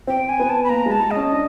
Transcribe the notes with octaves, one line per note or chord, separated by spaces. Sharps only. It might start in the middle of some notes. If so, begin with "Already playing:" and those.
C4 G5
G#5
B3
A5
B5
A#3 A#5
G#3
A5
G#3
D#5
C#4
D4